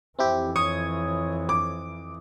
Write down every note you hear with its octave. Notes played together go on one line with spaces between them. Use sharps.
F2 E3 C4 E4 G4
C#5 C#6 D#6 G#6
D6